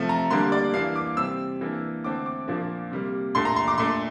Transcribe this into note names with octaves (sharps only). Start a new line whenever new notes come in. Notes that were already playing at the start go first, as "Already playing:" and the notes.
Already playing: C3 F3 A3
A#5
D3 G3 A#3 D4 C6
D5
E3 A#3 D4 F5
D6
C3 G3 C4 E6
E3 A#3 D4
D3 A3 C4 D6
D6
A#2 F3 A#3 D4
C3 G3 A#3
A#2 A3 D4 C6
A#5
C6
D6
A#2 A3 D4 C6